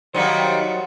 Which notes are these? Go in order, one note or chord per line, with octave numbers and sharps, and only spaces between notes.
D#3 F#3 G3 A#3 C5 D#5 F#5